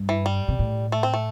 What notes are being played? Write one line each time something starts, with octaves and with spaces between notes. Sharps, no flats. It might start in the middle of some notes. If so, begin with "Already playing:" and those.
Already playing: G2
E3
G3
C3
A2
A3
C4
A3